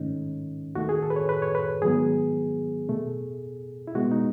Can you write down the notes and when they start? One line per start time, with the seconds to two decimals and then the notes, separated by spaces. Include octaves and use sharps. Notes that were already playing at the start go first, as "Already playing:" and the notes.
Already playing: G#2 D#3 A3 C#4 D#4
0.75 D#2 D#3 A3 F#4
0.89 G#4
1.03 A4
1.10 B4
1.16 C#5
1.29 B4
1.42 C#5
1.55 B4
1.82 G#2 D#3 F#3 B3 G#4
2.89 B2 A3
3.87 E4
3.95 B2 G#3 B3 F#4
4.11 D#4